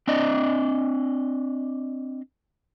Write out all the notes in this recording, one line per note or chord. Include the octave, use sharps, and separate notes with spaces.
C4 D4 D5 D#5